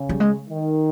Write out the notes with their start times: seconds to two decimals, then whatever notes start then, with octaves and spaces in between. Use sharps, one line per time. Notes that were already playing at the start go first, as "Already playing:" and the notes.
Already playing: C#3
0.09 G3
0.20 G#3
0.48 D#3